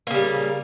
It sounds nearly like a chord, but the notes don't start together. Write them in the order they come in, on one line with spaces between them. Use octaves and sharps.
A#3 C#3 G3